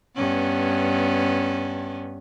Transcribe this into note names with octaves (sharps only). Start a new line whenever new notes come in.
G2 B3 C#4